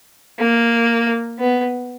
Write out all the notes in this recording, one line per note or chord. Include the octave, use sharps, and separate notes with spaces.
A#3
B3